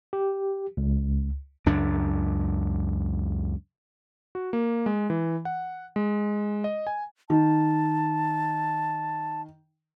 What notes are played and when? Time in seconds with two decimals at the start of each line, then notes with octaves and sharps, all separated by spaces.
0.13 G4
0.77 C#2
1.66 C#2 F#2 D4
4.35 F#4
4.53 A#3
4.86 G#3
5.10 E3
5.45 F#5
5.96 G#3
6.64 D#5
6.87 G#5
7.30 D#3 A5